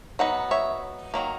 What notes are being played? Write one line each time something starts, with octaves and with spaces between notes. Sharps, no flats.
F#3 B3 D#4 F#5
C#5 E5
D#3 F#3 A#3